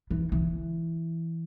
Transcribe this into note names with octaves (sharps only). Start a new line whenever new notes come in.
E3
E3